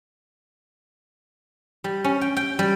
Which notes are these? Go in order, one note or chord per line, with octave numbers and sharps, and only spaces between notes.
G3
C#4
G5
G5
G3